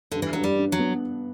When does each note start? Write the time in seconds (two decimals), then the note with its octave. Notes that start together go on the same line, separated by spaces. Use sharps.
0.12 G2 D3
0.22 E3
0.33 G2 F#3
0.44 G3
0.58 D4
0.72 F#3
0.79 B3